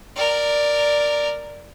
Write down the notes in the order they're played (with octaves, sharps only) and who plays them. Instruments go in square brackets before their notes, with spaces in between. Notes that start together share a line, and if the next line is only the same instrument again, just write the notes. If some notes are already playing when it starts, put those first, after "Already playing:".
[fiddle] A#4 D5